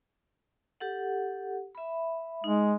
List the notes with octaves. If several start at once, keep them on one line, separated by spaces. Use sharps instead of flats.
G4 A4 F#5
E5 B5
G#3 D#4